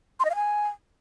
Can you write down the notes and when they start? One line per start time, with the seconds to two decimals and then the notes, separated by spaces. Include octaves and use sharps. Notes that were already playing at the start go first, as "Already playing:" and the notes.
0.20 C6
0.25 D#5
0.30 F5
0.35 G#5